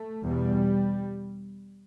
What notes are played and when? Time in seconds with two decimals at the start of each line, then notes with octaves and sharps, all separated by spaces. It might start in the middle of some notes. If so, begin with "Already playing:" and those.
Already playing: A3
0.25 E2 B2 G3